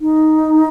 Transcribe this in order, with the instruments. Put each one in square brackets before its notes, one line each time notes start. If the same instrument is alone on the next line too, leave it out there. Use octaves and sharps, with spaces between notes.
[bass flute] D#4